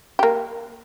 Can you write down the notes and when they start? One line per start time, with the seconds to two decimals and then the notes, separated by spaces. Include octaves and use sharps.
0.19 A#3 G4